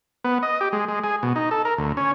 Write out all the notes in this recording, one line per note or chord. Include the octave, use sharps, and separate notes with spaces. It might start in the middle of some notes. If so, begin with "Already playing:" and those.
B3
D#5
G4
G#3
G#3
G#4
B2
D#4
A4
A#4
D2
C#4